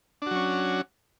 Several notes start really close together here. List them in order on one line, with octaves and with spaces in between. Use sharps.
D4 F#4 F#3 C#4